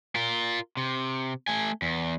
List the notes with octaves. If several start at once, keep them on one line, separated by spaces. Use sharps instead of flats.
F4 A#4
C3
A3 G#5
E2